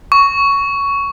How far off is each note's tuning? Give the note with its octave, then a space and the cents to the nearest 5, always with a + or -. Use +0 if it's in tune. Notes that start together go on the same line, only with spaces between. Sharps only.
C#6 +10